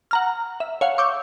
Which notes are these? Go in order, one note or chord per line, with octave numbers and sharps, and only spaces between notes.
F#5 A#5 F6
E5
C#5 F5 F#5
C#6 D6 E6 G6